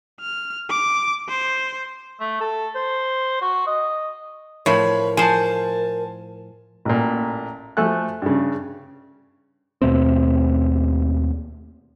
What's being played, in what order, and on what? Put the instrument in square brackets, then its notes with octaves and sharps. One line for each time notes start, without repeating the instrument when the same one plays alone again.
[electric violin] F6
D6
C5
[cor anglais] A3
A4
C5
F#4
D#5
[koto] A2 F3 [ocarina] A#4 [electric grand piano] C#5 B5
[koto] F3 C5 [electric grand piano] G#5 A5
[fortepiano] A1 A#2
F3 A3 A4 G#5 F#6
G2 C#3
[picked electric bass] D#2 B2 A3 C4